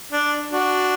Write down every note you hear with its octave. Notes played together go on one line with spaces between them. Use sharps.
D4
D4 F#4